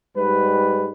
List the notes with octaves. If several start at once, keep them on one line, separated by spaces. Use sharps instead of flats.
G#2 G3 G#3 B4